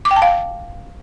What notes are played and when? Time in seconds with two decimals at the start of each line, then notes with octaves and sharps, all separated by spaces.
0.05 D6
0.11 G5
0.16 A5
0.22 F5